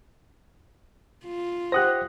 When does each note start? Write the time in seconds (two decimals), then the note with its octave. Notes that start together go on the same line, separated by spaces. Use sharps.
1.25 F4
1.72 G4 C5 F#5 D#6 F#6 A#6